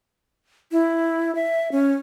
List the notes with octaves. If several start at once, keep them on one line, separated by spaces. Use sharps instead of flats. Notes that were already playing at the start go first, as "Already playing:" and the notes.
E4
E5
C#4